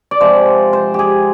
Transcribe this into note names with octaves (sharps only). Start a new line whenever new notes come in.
D5
C3 F3 G#3 C5
C5
G4 G#4